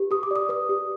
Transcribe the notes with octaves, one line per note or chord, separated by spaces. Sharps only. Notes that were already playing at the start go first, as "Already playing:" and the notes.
Already playing: G4 B4
G4 D#6
D6
D5 D#6
B4 D#6
G4